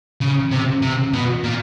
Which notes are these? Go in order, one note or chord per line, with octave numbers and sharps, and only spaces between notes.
C#3
C3
C3
B2
A#2